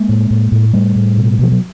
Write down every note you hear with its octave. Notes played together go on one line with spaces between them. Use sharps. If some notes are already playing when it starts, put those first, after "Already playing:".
Already playing: G#3 A#3
A2
A2
A2
A2 G3 A3
A2
B2
B2 F3
F#3